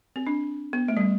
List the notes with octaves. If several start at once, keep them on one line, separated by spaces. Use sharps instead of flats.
C4
D4
B3
A3
G3